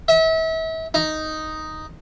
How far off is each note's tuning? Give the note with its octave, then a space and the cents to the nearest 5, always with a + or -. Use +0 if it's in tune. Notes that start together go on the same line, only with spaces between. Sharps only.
E5 -35
D#4 +0